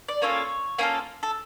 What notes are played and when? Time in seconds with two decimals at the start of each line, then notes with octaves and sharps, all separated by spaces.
0.08 D5
0.22 A#3 C#4 F4 A4 C#5
0.78 A#3 C#4 F4 A4
1.23 A4